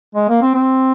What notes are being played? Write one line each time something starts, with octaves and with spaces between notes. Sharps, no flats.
G#3
A#3
C4
C4